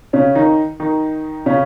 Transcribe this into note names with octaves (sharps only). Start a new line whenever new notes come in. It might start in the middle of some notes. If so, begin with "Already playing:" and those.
C#3 C#4
D#3 D#4
D#3 D#4
C#3 C#4